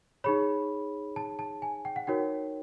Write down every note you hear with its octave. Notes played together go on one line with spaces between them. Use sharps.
D#4 G#4 C#5 B5
A5
A5
G#5
G5
F#5
D#4 F#4 A#4 C#5 G5